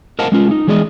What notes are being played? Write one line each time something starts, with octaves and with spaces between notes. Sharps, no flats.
A#4 C5 D#5 F5 F#5 A5
G#3 C#4 F4
D#4
E3 G#3 G#4 D5 D#5